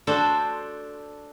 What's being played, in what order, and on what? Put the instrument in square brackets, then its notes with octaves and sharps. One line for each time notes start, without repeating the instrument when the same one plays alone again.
[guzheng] D4 F#4 A4 C5